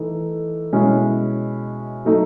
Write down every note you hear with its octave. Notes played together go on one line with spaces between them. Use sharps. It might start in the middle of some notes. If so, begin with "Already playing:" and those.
Already playing: E3 A3 D#4
B2 G#3 C#4 E4
F#3 A3 D#4